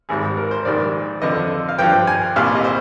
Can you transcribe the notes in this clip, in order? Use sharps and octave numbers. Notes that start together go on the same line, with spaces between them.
G#1 G#2 G3 G#4
A#4
C5
A#1 G#2 D#3 G3 D5
F2 D3 F3 D#5
F5
G2 F3 G5
G#5
C2 A#2 G3 F5
D#5
C5